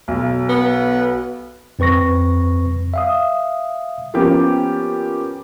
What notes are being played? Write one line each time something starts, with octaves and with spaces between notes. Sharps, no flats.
B1
B3
F2 C4 B4 C#6 A#6
E5 F5 D#6
F3 A#3 B3 C#4 G4